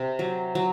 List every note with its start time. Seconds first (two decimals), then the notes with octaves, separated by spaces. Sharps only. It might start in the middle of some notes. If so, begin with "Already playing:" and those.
Already playing: C3
0.19 F#3
0.55 F#3